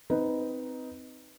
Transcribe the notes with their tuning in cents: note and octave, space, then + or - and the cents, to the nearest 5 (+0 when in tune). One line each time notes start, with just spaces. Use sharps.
C4 -15 D#4 +5 B4 +0